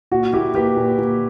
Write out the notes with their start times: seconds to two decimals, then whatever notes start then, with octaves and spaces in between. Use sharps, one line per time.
0.11 A#2 F#4
0.33 A#3 E4 G4
0.55 A#3 G4 B4
0.77 A#2
0.98 A#2